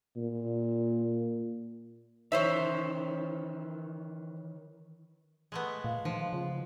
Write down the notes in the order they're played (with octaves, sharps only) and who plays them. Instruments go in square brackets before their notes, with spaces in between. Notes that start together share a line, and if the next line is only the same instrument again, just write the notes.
[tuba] A#2
[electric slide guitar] D#3 E3 [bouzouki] C#4 C5 E5
[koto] G#3 A3 B3
[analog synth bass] A#2 [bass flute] F5
[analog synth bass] D#3 [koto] F3
[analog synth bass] C#3 [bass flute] F4